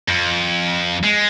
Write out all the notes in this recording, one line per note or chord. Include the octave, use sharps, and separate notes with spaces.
F2
G#3